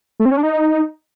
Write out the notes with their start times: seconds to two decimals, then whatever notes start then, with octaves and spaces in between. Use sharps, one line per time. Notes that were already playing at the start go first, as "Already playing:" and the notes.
0.20 A3
0.25 C4
0.31 C#4
0.37 D4
0.43 D#4